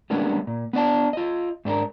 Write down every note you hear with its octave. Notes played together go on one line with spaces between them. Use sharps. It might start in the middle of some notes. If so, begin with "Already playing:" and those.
G3 G#3 A#3 B3 C#4 D4
A#2
B3 D4 D5 A5
F4 D#5
G#2 D4 G#4 A#4